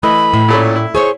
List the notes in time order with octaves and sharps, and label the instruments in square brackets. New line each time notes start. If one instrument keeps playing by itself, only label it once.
[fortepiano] E3 D#5 [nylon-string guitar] A3 [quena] B5
[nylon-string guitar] A2
[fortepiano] A#2 A3 C#4
E4
[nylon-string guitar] G#4 C5 C#5 [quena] C#6